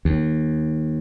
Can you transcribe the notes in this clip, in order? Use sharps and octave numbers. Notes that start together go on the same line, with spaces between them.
D#2